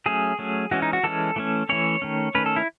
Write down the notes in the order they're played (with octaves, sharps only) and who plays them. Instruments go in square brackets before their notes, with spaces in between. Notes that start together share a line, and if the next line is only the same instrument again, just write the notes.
[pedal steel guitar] F#3 A3 C#4 G#4
F#3 A3 C#4
E3 G#3 C#4 F#4
D#4
F#4
E3 G#3 C#4 A4
E3 A3 C#4
E3 A3 C#4 C#5
D#3 A3 C#4
D#3 A3 C#4 B4
A4
E4